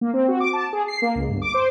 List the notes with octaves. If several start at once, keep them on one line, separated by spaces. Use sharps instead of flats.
A#3
C4
F#4
D6
A5
G#4
C7
A#3
C#2
G1
D6
C5